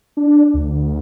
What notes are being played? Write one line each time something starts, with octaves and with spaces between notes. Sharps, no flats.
D4
D2